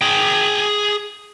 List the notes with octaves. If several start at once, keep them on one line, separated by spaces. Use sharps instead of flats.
G#4 G5